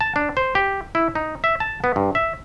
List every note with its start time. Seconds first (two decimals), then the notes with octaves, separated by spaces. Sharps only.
0.01 A5
0.16 D4
0.37 C5
0.55 G4
0.95 E4
1.15 D#4
1.44 E5
1.60 A5
1.84 B3
1.96 G2
2.15 E5